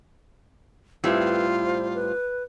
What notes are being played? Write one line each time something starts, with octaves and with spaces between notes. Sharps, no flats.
A2 G3 C4 F4 B4
C5
B4